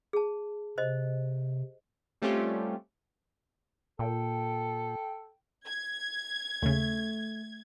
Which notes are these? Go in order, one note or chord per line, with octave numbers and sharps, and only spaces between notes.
G#4 A5
C3 C5 D#5
G3 A3 C4 C#4 F4 G4
A#2 A4 G5
G#6
D#2 C#3 A3